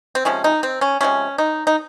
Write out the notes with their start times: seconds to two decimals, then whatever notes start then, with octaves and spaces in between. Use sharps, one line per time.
0.15 C4
0.25 C3 F3 G#3 C#4
0.44 D#4
0.63 C4
0.81 C#4
1.01 C3 F3 G#3 C#4
1.38 D#4
1.67 D#4